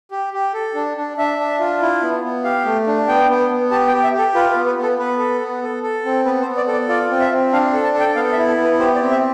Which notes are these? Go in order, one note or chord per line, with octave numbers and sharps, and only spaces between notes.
G4
G4
A4
D4
D4
D4 E5
D4
F4
E4
B3
B3
G4 F5
A3
D4
B3 G5
B3
B3
G4 A5
G5
G4
E5
G4
A4
F4 B4
B4
B3
B4
B3
A4
B3 B4
A4
B3
A4
A4
C4
B3 B4
C5
B3
D5
A4
D5
F4 D5
C4
E5
C4
D4 F5
A4
A5
A4
G5
B3 F5
E5
E4
A4
B3
B4
G4 C5
D5
C4
E5